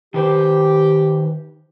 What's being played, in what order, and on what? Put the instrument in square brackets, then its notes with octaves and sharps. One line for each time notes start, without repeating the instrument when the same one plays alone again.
[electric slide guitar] D#3 B4 C5 [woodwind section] G4